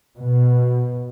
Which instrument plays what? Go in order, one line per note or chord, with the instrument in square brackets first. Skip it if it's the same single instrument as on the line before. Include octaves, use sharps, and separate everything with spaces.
[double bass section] B2